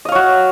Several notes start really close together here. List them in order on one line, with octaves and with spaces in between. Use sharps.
D#5 F5 C#5 F#4